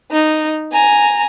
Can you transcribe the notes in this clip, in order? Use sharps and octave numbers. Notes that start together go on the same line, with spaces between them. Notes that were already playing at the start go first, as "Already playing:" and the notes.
D#4
G#5 A#5